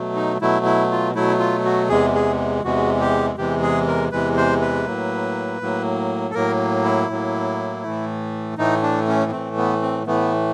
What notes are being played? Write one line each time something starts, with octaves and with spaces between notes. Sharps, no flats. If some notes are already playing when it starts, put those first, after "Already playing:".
Already playing: B2 F#3 A3
D#4
B2 F#3 A3 E4
E4
F4
B2 F#3 A3 E4
F4
F#4
E2 C3 E3 G#3 G#4
G#4
E2 C3 E3 G#3 F#4
G4
E2 C3 E3 G#3 G4
G#4
A#4
E2 C3 E3 G#3 B4
C5
B4
A2 F#3 A#3
A2 F#3 A#3
A4
A2 F#3 A#3 A#4
E4
A2 F#3 A#3
A2 E3 A3
A2 E3 A3 D#4
D4
C#4
A2 E3 A3 C4
B3
C4
A2 E3 A3 B3